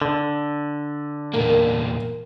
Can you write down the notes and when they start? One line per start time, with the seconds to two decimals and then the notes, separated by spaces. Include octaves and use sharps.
0.02 D3
1.34 E2 A#2 A#3 A#4